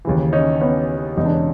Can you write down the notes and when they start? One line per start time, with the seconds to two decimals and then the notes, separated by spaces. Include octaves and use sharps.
0.05 D#2 C#3 E3
0.33 C#4 D#4
0.61 B3 C#4
1.17 E1 E2 C#3 E3 D#4
1.25 D4
1.33 C#4